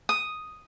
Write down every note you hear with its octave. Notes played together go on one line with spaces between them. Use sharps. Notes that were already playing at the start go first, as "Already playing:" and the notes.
D#6